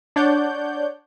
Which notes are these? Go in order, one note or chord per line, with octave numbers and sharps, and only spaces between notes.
D4 C#5 D5 F#5 G6